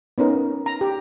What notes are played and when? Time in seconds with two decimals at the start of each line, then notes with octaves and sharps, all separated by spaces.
0.18 B3 C#4 D#4 A#4
0.66 A#5
0.81 G4